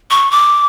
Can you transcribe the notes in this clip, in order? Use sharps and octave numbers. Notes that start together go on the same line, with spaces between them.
C#6
D6